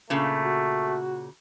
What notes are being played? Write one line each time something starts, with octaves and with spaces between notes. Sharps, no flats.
A#2 C#3 A3
F#4